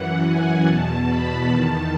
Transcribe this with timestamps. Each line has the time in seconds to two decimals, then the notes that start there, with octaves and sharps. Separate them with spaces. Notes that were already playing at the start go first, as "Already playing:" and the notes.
Already playing: F#2 E3 F#5
0.25 G#5
0.66 E2 B2 A5
1.07 B5
1.48 E2 D#3 A5